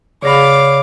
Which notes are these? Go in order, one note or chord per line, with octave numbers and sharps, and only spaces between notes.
C#3 G#4 C#5 D5 F5 B5 D6 A#6